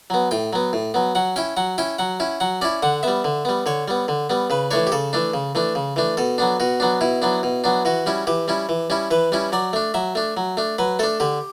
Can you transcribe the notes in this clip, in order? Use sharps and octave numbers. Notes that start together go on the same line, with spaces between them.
F#3 B3
A2 G5
F#3 B3
A2
F#3 B3
F#3 F#5
C#4 E4 G5
F#3 F#5
C#4 E4 G5
F#3 F#5
C#4 E4
F#3 F#5
C#4 E4 D5
D3 F#5
G3 B3 E5
D3
G3 B3
D3 C#5
G3 B3
D3
G3 B3
C#3 B4
E3 A3 D4 C#5
G4
C#3 A4
E3 A3 D4
C#3
E3 A3 D4
C#3
E3 A3 D4
B2 A4
F#3 B3 D4
B2 F#4
F#3 B3 D4
B2 E4
F#3 B3 D4
B2
F#3 B3 D4
E3 F#4
G3 C#4 E4
E3 G4
G3 C#4 E4
E3
G3 C#4 E4
E3 B4
G3 C#4 E4
F#3 D5
A3 D4
F#3 E5
A3 D4
F#3
A3 D4
F#3 B4
A3 D4 A4
D3 G4